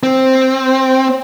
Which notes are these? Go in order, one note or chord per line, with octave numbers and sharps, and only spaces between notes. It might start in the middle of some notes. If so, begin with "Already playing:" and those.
C4